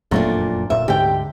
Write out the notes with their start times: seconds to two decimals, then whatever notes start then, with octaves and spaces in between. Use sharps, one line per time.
0.11 F#1 F2 A#2 F#3 A3 D4
0.70 D1 A#2 E5
0.88 D2 G#2 D3 G4 G5